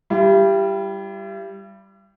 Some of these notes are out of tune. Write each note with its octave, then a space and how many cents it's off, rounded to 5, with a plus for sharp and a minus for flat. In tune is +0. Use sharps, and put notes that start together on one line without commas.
G3 +0 E4 +45